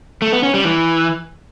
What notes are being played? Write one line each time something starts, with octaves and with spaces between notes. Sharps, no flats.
A3
B3
C#4
G3
E3